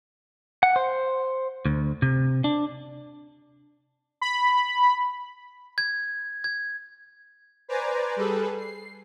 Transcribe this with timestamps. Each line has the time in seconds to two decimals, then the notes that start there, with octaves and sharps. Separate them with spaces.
0.63 F#5
0.76 C5
1.66 D2
2.02 C3
2.44 D4
4.21 B5
5.78 G#6
6.44 G#6
7.68 B4 C5 D5 G#5 A#5 D6
8.16 G3 G#4 A4 B4
8.58 C7